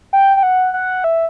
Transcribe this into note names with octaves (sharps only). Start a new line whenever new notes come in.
G5
G5
F#5
F#5
E5